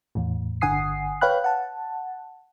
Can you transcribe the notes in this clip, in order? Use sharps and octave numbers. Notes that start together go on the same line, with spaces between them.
E2 A2
G1 D3 F#5 G#5 D#6 C7
B4 C#5 F5 G5 B5 F#6
F#5 A5